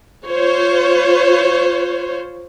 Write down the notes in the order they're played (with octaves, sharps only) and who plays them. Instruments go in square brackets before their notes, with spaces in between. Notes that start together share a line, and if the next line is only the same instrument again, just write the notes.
[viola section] F4 C5 C#5